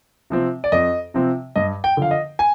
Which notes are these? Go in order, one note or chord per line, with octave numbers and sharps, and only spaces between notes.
C3 F3 C4
D5
F2 D#5
C3 F3 C4
G2 D#5
G5
D3 F3 F5
D#5
G#5